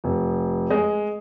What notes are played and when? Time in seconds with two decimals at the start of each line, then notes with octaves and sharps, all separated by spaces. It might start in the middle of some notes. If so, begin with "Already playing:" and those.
0.04 F1
0.70 G#3